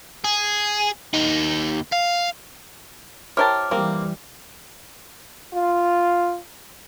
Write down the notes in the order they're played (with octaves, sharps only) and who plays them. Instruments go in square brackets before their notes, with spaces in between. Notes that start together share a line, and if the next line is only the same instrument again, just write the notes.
[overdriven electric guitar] G#4
D#2 D#4
F5
[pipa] E4 A#4 A5 [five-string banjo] G4 C5 C#5 [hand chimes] D6 F6
[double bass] E3 G3 [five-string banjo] F3 A#3 C4 [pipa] A#4
[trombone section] F4